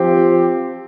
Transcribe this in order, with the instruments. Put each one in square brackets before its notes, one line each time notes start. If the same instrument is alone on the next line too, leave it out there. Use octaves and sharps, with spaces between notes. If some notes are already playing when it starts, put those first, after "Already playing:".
Already playing: [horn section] F3 C4 G4